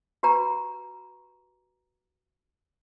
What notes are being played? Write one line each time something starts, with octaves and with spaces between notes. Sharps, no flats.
F#4 G4 B4 A#5